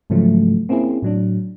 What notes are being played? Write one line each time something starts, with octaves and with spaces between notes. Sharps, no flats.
G#2 C#3 F3 F#3 A3
A#3 C4 C#4 E4 G#4
A2 F#3 D4